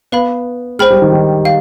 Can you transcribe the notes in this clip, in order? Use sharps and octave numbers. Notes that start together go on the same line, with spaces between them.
B3 B4 F5 B5
G#3 C5 G5 B5 F6
G3
D#3
D#3
F5